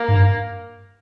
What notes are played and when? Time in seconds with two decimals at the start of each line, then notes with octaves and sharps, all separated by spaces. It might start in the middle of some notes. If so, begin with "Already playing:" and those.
Already playing: A#3
0.08 G#2
0.15 G2